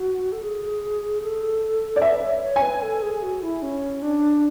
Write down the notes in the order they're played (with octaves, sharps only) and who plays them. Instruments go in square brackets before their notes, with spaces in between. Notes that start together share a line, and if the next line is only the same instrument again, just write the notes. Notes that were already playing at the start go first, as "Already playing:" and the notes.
Already playing: [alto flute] F#4
A4
G#4
A4
[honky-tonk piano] D5
[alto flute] B4 [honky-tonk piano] E5
[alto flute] C#5
C#5
[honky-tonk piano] G#5
[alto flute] B4
A4
G#4
F#4
E4
C#4
D4